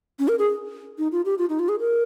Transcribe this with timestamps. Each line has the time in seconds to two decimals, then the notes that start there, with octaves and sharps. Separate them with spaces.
0.19 C#4
0.28 A#4
0.39 G#4
0.98 D#4
1.12 F4
1.25 G4
1.38 F4
1.49 D#4
1.59 F4
1.69 G#4
1.79 A#4